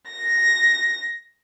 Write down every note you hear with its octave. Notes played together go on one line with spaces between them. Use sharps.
A#6